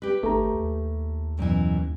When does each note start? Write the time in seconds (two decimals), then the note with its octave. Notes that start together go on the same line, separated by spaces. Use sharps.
0.02 G4 B4
0.23 G#1 A3 A#5
0.53 D#2
1.39 F#2 B2 E3